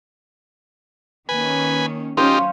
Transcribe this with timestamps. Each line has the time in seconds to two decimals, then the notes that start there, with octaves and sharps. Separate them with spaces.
1.29 D#3 A#3 C#4 B4 G#5
2.17 F#3 C#4 D#4 F4 G4 C5 F5